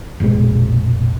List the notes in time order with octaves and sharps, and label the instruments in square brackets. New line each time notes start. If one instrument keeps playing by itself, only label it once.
[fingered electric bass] F1 A#1 B2 G#3